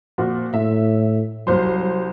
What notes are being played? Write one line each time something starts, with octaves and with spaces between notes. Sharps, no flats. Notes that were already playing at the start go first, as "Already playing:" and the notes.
A#2 F3 F#4
A2 E5
C2 F#3 C5 C6